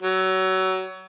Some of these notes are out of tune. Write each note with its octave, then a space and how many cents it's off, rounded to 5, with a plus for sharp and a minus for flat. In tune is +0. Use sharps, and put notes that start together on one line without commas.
F#3 +25